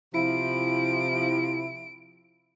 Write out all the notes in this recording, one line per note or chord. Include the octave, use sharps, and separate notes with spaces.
C3 F3 E4 D7